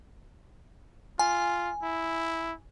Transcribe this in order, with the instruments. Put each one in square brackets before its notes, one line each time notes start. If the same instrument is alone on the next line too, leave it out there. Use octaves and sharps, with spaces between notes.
[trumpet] F4 [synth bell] G#5
[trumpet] E4